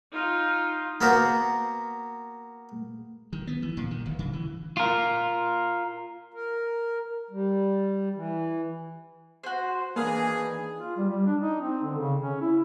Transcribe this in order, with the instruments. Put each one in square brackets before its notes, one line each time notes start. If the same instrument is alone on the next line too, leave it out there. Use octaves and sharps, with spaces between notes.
[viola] D#4 F4
[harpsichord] A#3 B3 F#4 A#4 C5
[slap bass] D#3
B3
E3
A#2
D#3
D1
C#3
E3
[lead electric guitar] F4 A#4
[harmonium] A#4
G3
E3
[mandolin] F#4 C5
[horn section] D#3 D4 G#4 [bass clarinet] E3 [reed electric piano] A#3 B4 [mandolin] F5
[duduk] F4
G3
G3
D4
D#4
C4
D3
C#3
C#4
E4